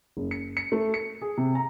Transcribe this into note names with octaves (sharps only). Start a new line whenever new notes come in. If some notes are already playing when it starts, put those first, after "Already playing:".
F#1
C#7
C#7
A3
C#7
G#4
C3
A#5